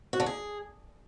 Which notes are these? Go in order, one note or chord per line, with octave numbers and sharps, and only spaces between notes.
F#4
D3
G#4